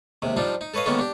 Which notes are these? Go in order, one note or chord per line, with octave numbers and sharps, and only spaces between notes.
D#2 C3 G#3
F3 G3 D4 D#4 F4
D#4
A4 B4 C#5 D#5 F5
D#3 G#3 A#3 B3 C#4 A4
D4 G4